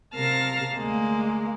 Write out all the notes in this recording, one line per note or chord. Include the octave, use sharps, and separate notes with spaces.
C3 A#4 F5 A5 F6 A#6
D2 G#3 A#3